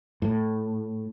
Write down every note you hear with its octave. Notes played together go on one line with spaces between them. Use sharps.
A2